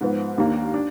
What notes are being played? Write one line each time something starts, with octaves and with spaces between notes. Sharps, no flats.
G#2 F3 B3
D#2 D#3 A#3 D4
D4